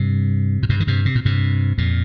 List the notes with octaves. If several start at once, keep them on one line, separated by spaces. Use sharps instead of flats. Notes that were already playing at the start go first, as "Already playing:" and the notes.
Already playing: G2 C3
A#2
G2 C3
D#3
G2 C3
C3
A#2
G2 C3
F2 A#2